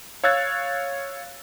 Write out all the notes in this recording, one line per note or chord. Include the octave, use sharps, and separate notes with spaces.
C#5 F5 E6 F#6 G#6 A6